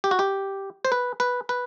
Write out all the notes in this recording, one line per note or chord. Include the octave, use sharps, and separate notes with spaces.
G4
F#4
G4
C5
B4
B4
B4